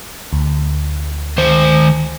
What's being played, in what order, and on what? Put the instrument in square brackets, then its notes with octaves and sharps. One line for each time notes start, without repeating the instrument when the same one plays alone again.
[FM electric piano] D2
[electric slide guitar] D#3 C5